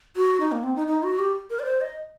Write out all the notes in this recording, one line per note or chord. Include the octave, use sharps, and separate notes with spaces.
F#4
D#4
A#3
C4
D#4
D#4
F#4
G4
A#4
D5
C5
D#5